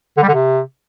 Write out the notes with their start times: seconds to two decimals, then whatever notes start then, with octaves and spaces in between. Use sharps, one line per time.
0.17 D3
0.23 G3
0.28 D3
0.34 C3